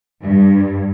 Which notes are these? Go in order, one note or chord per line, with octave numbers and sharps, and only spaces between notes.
G2